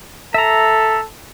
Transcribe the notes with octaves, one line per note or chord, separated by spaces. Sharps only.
A4 E5 A#5